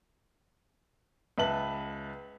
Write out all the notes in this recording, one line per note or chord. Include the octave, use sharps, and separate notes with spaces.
C#2 B4 E5 A5 F#7